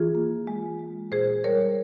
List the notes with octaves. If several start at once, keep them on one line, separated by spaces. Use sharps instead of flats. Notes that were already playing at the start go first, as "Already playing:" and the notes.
Already playing: E3 F4 G#4
A#3
G#3
G#3
A#2 G#4 C5
G3 A#4 C#5